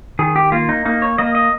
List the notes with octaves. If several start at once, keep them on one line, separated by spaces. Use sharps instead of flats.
D#3 G#4
G4
A#3 F4
D#4
A#3 D#4
C#5
A#3 D#5
D#5